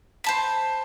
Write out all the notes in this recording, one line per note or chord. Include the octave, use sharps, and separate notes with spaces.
C5 A5 B5